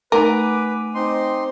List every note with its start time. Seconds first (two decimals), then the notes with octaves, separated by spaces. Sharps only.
0.12 A3 A#4 B4 G#5 D6 D#7
0.95 C4 D#4 C6